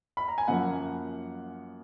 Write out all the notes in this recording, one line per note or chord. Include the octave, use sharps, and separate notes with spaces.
B5
A#5
G#5
F#2 F3 A#3 F#5